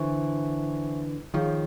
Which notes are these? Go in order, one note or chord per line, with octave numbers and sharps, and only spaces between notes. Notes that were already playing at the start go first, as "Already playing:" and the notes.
Already playing: D3 E3 C5 E5 G#5 C#6
D#3 F3 G#4 C#5 F5